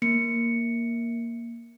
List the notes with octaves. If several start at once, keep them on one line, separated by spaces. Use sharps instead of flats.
A#3 C#7